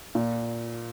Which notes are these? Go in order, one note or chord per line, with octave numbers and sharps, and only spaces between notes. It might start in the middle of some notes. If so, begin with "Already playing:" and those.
A#2